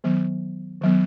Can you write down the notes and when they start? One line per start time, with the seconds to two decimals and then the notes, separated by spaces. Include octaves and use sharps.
0.04 D#3 F#3 B3
0.81 D#3 F#3 B3